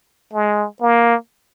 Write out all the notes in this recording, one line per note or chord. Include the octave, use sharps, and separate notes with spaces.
G#3
A#3